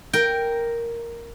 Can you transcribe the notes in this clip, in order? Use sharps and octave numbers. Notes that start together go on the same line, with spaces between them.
A#4 G5